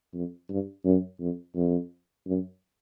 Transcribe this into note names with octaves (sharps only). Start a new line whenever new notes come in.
F2
G2
F#2
F2
F2
F#2